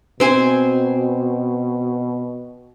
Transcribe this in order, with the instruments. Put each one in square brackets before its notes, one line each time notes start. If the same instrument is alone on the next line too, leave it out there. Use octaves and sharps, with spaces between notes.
[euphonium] B2 [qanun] C4 C5 G#5